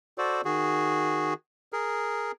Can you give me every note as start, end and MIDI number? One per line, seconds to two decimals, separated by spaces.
0.18 0.41 66
0.18 0.41 69
0.18 0.41 72
0.18 0.41 74
0.45 1.34 51
0.45 1.34 66
0.45 1.34 68
1.73 2.32 68
1.73 2.32 70